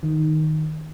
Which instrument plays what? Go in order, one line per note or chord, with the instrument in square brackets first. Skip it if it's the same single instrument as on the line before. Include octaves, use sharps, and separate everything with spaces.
[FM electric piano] D#3